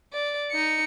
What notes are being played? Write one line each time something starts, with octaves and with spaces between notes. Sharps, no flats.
D5
D#4 C#7